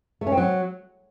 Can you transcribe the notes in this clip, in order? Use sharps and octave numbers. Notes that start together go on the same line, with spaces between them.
A3
C#4
C4
F#3